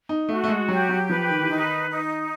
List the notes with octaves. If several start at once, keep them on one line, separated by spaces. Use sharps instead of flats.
D#4
A3 F#4
A3
G#3
F#3 G4
F#3
F3 B4
D#3
E3
D#3 D#4
D#4